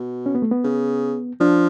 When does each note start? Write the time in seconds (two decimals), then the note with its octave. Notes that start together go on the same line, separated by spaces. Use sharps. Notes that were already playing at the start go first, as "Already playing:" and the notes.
Already playing: B2
0.26 C#4
0.35 B3
0.42 A3
0.52 B3
0.64 C#3
1.40 F3 D4